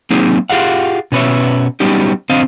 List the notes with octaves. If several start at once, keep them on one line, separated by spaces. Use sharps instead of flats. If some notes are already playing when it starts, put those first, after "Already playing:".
F#3 A#3 C4 D#4 G#4
F4 G4 G#4 F5 F#5
B2 C#4 B4 C#5 E5
F#3 G3 B3 C#4 D#4 G4
D3 C4 C5 D#5 F5